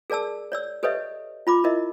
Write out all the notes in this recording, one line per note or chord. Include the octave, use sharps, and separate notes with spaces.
G#4 A#4 D5 A5 E6
C#5 D5 E6
G4 A4 B4 C#5 D#5 E5
F4 B5 D6
E4 A#4 D#5 E5